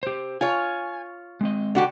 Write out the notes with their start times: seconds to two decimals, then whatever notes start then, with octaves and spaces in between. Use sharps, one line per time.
0.03 G4 C5
0.41 F4 C#5 G#5
1.41 G#3 C4 D#5
1.75 D3 F#4 G4